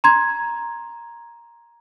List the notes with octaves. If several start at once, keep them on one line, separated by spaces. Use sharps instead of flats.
A#5 C6 G#6